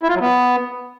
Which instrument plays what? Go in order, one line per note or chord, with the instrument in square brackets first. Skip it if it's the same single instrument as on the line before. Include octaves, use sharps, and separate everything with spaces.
[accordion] E4
F4
F#3
B3